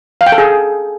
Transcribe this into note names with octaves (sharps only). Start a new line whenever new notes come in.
F5
G5
A4
G#4